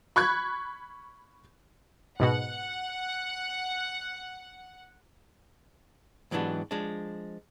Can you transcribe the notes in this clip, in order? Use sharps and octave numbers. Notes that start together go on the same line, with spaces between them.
B5 C#6 F#6 G#6
G#2 B2 F#4 F#5
G#2 E3 F#3 B3 D4 G4
F3 G#3 D4